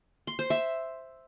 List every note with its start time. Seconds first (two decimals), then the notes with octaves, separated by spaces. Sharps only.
0.27 C6
0.39 C5
0.50 E5